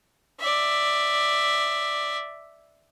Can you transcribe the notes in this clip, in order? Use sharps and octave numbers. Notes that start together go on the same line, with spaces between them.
D5 E5